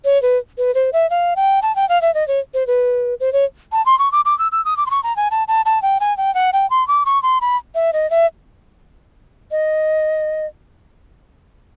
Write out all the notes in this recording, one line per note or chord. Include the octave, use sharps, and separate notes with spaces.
C#5
B4
B4
C5
E5
F5
G5
A5
G5
F5
E5
D#5
C#5
C5
B4
C5
C#5
A5
C6
C#6
D6
D6
E6
E6
D#6
D6
C6
C#6
A#5
G#5
A5
A5
A5
G5
G#5
G5
F#5
G5
C6
D6
C#6
C6
B5
E5
D#5
E5
D#5